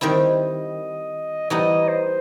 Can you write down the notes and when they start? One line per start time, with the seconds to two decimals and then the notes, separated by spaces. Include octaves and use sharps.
0.01 D#3 G3 C4 E4 D#5
1.50 E3 G3 B3 D#4 D#5
1.88 C5